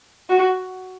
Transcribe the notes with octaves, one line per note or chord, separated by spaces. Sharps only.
F#4